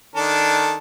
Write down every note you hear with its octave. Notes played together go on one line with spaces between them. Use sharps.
D#3 D4 A4